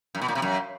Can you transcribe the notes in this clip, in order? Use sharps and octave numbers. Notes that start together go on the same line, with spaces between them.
F#2
B2
A#2
C3
F#2